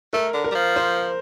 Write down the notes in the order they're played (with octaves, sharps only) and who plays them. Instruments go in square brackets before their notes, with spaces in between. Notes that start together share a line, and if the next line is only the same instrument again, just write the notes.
[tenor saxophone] A3 [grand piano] A#4
[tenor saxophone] D3
[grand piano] A#4
[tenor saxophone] G3
F3
[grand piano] C5